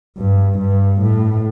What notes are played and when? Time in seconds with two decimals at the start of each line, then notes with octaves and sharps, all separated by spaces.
0.18 G2
0.59 G2
1.02 A2